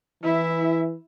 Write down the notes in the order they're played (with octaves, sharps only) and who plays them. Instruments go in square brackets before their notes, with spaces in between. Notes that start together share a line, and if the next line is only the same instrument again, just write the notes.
[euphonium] E3 [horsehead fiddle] E4 E5